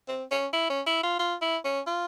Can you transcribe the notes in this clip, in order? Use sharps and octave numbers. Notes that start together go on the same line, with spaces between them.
C4
C#4
E4
C#4
E4
F4
F4
E4
C#4
F4